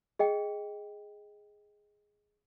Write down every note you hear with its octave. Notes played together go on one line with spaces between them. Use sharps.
G#4 D#5 G5 C#7